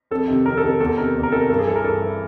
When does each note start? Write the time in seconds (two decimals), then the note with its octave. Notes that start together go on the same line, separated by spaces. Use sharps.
0.11 F2 A4
0.28 C3 D#3
0.45 F2 A#4
0.57 A4
0.63 C3 D#3
0.69 A4
0.80 E2 A4
0.97 C3 D#3 A#4
1.15 E2
1.23 A#4
1.32 C3 D#3 A4
1.41 A#4
1.50 G2 A4
1.59 G#4
1.67 E3 A4
1.76 A#4
1.84 G2 A4
2.02 E3